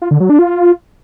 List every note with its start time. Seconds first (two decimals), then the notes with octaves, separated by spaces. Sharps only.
0.02 F4
0.11 D3
0.20 F#3
0.30 D4
0.39 F4